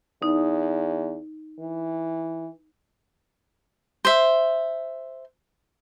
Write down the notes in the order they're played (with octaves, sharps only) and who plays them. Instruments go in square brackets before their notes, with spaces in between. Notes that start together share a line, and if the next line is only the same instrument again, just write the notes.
[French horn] E2 [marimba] D#4
[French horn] E3
[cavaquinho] C5 E5